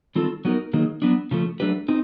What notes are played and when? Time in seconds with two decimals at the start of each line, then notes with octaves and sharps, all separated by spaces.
0.15 D#3 G3 C4 F4 A4
0.45 F#3 B3 D#4 F#4 A#4
0.73 D#3 F#3 A#3 D#4 G#4
1.02 F#3 B3 D4
1.31 C#3 F3 A3
1.60 F#3 A3 D4 G4 B4
1.88 C4 D#4